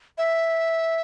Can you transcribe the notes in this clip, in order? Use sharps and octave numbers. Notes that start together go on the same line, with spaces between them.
E5